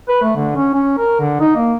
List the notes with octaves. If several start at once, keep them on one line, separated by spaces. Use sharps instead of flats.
B4
A3
D3
C#4
C#4
A#4
D3
D#4
A#3